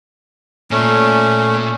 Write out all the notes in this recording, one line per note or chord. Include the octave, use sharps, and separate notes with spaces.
A#2 A3 C#4